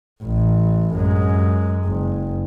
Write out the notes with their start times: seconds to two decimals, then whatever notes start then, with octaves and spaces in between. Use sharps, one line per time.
0.23 A1
0.96 F#2 G#3
1.85 F#1